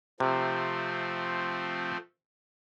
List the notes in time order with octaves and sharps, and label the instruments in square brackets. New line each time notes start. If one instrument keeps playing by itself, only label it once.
[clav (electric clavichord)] C3 [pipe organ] F3 A3 C4